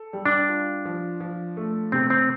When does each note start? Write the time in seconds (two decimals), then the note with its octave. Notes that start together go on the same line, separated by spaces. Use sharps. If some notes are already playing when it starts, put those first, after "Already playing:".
Already playing: A4
0.13 G3
0.25 D4
0.49 F4
0.85 F3
1.20 F3
1.57 A3
1.92 C3 C4
2.10 C4